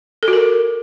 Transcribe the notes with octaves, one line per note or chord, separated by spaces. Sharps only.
A4
F#4
A#4